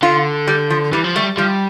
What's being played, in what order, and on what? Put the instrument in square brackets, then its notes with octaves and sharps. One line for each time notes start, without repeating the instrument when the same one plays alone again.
[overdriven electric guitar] D3 [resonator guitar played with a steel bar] F4
[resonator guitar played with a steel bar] G3
F3
[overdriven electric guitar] E3 [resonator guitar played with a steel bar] G3
[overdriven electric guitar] F3
[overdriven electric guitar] G3 [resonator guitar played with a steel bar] A3
[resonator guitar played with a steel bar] F3 [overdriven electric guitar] G3